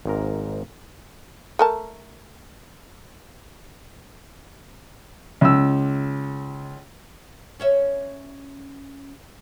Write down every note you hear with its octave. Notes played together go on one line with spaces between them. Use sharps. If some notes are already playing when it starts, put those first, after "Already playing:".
G#1 G#2 A#4
A3 A#4 A5
C#2 E6
C#4 C#5 E5